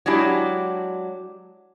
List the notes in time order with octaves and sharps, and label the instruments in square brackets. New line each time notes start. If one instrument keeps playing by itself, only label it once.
[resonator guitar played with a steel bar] F#3 G#3 D4 E4 G4